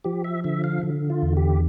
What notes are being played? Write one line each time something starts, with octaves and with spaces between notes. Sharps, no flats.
F3 G4
E5
D3 E5
F5
D3
F4
E2
G4